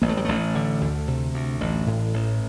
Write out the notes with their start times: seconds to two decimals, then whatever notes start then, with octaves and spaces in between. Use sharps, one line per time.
0.02 A1 A#3
0.09 A3
0.17 G3
0.25 A1 A3
0.55 D3
0.81 D2
1.07 C3
1.34 D2
1.61 A1
1.87 A2
2.14 A1